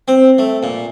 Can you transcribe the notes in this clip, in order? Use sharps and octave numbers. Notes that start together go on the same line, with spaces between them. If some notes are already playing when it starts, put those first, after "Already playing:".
C4
A3
A#2